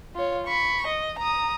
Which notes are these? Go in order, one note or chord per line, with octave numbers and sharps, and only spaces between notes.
F4 C#5
B5 C#6
D#5
A#5 D#6